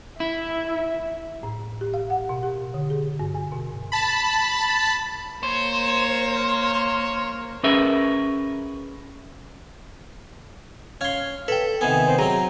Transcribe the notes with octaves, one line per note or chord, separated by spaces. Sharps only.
E4 E5
A2
G4
F5
F#5
B2
G4
D3
G#4
G2
G#5
B2
A5 B5
A#3 C5 C#5
C#4 G#4 A#4 B4 E5
C#4 F5 C6 F6 G#6
A4 B4 G5
C3 D#3 B3 G#5
C4
F#3 C4 G#4 A#5